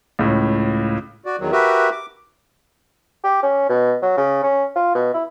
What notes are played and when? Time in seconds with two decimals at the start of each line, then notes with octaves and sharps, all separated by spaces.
0.19 C#2 A2
1.26 F#4 D5
1.39 E2 D#3 F#3
1.52 F#4 G4 A#4 B4 E5
1.92 D6
3.24 G4
3.43 C#4
3.69 B2
4.02 F#3
4.17 C#3
4.43 C#4
4.76 F4
4.95 B2
5.14 E4